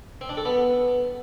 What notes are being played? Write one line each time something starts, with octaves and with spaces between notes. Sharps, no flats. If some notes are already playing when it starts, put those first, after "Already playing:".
C4
D4
A4
B3